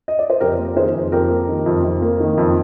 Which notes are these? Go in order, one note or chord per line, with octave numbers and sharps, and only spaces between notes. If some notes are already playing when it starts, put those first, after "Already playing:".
D#5
D5
C5
F2 G4 A#4
A#3
D#3 G#4 C5
F2
F2 G4 A#4
A#3
D#3
F2
F2
A#3
D#3
F2